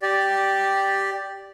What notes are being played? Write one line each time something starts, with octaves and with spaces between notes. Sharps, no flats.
G4 D5